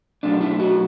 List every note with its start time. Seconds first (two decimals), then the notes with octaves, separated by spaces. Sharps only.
0.23 B2 F#3 A3 D4
0.41 E4
0.59 F#4